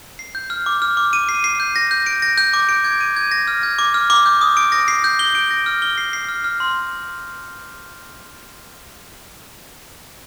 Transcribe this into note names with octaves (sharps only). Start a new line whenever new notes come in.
C7
G6
F6
D6
F6
D6
D#7
C7
C7
G6
A#6
G6
D7
A#6
G6
D6
D7
G#6
D#7
G#6
A#6
F6
G#6
D6
F6
D6
G6
D#6
D7
A#6
C7
G6
G7
D7
A#6
F6
G7
C7
C7
F6
F6
C6